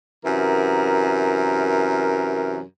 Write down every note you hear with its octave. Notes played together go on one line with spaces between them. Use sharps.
F#2 C3 E3 A#4